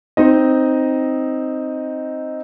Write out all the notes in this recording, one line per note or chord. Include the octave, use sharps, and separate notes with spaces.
C4 D#4 D#5